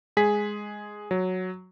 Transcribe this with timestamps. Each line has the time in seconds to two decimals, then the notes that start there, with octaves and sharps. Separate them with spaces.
0.17 G#3 G#4 B6
1.11 F#3